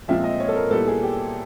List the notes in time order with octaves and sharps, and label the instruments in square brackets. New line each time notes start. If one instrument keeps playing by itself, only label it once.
[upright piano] A#2 F3 G#3 C4 F4 [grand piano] E5
[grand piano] D#5
C#5
A4
A#4
[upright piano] A#2 G3 B3 E4 [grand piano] A4
[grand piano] G#4
G4